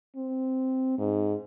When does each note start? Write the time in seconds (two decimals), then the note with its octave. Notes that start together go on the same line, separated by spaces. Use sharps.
0.16 C4
0.98 G#2